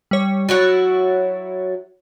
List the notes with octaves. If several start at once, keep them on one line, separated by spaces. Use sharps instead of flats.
G3 C#5
F#3 E4 F#4 C#5 A6